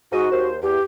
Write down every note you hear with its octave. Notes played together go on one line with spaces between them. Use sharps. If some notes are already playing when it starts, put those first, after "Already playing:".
G#2 F#4 D#5
D#2 C5
E2 G4